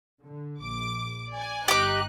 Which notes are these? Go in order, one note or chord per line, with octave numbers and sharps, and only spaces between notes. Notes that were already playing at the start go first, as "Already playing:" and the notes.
D3
A#1 D6
D5 G#5
G1 D#4 G4 D6 F#6